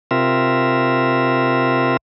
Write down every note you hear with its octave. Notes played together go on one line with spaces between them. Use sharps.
C3 C4 F4 A#4 E5